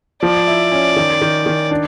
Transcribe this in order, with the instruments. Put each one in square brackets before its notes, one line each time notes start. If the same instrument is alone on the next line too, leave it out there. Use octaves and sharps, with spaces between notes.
[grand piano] F3 [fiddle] D5
[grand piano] E4
C#4
D#3
D#3
D#3
D4